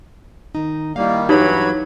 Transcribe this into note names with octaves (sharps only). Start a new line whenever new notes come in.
D#3 D#4
D#3 G3 A#3 E4 F5
G2 E3 F#3 D#4 G4 C#5 B5